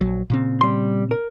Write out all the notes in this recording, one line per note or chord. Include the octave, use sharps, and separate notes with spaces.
A#1 F#3
A#2 C#3 C4
G3 C6
A#4